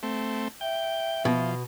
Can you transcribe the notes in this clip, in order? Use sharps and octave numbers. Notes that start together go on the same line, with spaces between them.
A3 C4
E5 G5
B2 F3